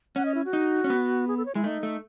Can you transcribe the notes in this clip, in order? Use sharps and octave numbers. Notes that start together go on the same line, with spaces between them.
C#4 F#5
D#5
E4
F#4
D#4
C#4
B3
G#4
A4
C#5
G#3 E4
A3 D#4
A3